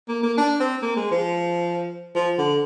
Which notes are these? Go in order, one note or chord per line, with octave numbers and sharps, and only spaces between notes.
A#3
A#3
D4
C4
A#3
G#3
F3
F3
D3